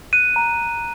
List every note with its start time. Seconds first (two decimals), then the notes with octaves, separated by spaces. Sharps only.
0.13 F#6 D#7
0.36 A#5